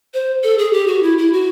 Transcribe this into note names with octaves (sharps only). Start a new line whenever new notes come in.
C5
A4
G#4
G4
F#4
E4
E4
F#4